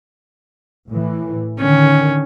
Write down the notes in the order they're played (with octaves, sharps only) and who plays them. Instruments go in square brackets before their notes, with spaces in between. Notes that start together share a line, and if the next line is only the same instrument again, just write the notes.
[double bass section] A2 E3
[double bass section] D3 D#3 [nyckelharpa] C#4